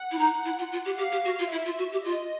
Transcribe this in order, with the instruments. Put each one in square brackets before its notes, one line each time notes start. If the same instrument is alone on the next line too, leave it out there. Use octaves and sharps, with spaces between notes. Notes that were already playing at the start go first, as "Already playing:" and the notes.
Already playing: [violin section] F#5
[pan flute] E4
D#4
E4
F4
F4
G4
[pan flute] G4 [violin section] F5
[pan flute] G4
F#4
F4
[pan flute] E4 [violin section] E5
[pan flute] F4
F#4
G4
[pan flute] F4 [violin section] D#5